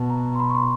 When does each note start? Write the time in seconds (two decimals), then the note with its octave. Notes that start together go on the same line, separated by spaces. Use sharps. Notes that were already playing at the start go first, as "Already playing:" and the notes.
Already playing: B2 A5
0.10 A#5
0.35 C6
0.40 B5
0.50 C#6
0.55 C6